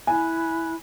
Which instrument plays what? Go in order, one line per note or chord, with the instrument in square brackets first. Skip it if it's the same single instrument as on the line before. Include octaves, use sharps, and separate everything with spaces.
[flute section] E4 B5 F#6 [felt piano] G#5